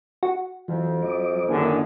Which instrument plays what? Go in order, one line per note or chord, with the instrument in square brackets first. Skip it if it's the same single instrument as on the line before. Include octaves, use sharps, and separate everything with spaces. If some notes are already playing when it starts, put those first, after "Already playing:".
[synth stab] F#4
[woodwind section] F2 [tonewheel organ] E3 F#3
[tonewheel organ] F#3 D#5 D6
[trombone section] F#2 D3 D#3 [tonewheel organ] A#3 D4 E4 [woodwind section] G#4